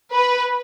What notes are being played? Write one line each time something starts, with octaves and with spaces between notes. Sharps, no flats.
B4